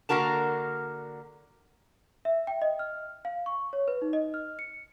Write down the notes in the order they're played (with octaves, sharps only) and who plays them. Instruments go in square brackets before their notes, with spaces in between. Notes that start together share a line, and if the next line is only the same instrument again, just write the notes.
[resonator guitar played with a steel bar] D3 A#3 F#4 A#4 A5
[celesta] E5
G5
D#5
F6
F5
C#6
C#5
B4
D#4
D#5
F6
C#7